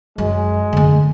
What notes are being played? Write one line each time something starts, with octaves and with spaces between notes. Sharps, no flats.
F#2 G#3
D3 A#3